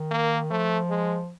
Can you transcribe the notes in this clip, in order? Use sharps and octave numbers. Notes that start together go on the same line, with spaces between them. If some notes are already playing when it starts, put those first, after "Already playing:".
Already playing: D#3
A#3
F3 A3
G#3